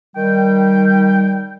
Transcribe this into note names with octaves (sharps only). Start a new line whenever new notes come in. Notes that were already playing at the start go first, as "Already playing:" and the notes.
D#3 G3 G5